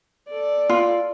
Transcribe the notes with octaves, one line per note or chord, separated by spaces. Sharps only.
A4 D5
F4